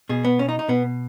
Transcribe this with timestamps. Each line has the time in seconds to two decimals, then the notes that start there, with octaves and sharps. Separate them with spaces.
0.09 B2 G#4
0.25 B3
0.39 C#4
0.49 D#4
0.59 D#4
0.68 B2 B3